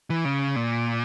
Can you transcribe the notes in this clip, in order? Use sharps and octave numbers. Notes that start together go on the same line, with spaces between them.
E3
C#3
A#2